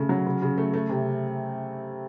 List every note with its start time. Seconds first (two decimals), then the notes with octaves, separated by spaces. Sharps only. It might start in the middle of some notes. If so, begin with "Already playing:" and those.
Already playing: C#3 A3
0.09 F#3
0.26 C#3
0.42 C#3
0.58 A3
0.74 A3
0.90 C3